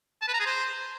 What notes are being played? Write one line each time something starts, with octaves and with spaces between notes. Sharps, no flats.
A5
B4
A#5
G#4
C5